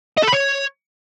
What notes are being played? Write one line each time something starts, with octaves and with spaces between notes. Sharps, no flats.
D#5
A4
B5
C#5